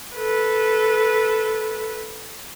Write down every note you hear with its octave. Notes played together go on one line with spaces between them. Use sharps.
A4 B4